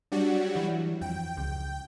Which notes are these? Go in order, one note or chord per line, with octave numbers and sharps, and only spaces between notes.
F#3 G3 D4 F#4
E3
F2 G5
C#2